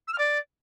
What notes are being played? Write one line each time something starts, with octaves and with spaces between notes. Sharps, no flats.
E6
F6
D5